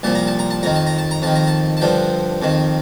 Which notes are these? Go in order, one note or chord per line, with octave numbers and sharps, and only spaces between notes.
C2 A#2 F3 A5
A#5
A5
A#5
A5
F2 D#3 A#5
A5
A#5
A5
A#5
F2 D#3 A5
A#5
A5
A5
G2 D3 F3 G5
F2 D#3